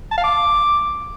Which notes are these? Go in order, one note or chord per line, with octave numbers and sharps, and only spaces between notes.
A5
F5
D6